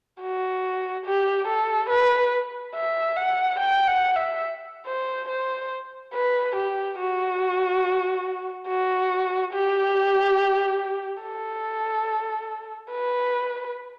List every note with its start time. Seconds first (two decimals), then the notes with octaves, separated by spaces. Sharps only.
0.21 F#4
1.06 G4
1.48 A4
1.90 B4
2.75 E5
3.17 F#5
3.60 G5
3.88 F#5
4.16 E5
4.86 C5
5.29 C5
6.14 B4
6.56 G4
6.98 F#4
8.68 F#4
9.53 G4
11.22 A4
12.92 B4